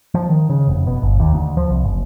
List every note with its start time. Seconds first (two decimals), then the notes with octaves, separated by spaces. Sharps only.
0.14 F3
0.29 D#3
0.50 C#3
0.68 F1
0.87 B2
1.02 G1
1.20 D#2
1.34 D2
1.57 F3
1.70 C2
1.84 F#1